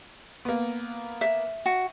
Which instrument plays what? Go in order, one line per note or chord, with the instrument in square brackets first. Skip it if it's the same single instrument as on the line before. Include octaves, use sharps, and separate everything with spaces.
[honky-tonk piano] A#3 B3
[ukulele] E5
[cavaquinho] F#4